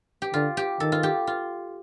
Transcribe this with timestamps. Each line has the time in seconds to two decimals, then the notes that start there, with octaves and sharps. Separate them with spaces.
0.22 G4
0.34 D3 F4
0.57 G4
0.80 D#3 A4
0.92 F4
1.03 G4
1.27 F4